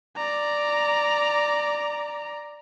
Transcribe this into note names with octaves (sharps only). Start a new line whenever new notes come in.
D5 A#5